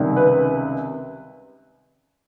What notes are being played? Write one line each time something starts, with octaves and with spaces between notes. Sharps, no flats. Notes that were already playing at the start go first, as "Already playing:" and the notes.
Already playing: C#2 C3 D#3 G3
B4